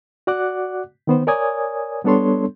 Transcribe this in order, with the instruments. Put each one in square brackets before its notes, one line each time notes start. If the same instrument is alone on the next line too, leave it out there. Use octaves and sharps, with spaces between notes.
[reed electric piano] F#4 D5 F#5 D6 F#6
D#3 B3 C5
A#4 C#5 D5 G#5 D#6 G#6
G3 B3 D4 A4 C#5 C6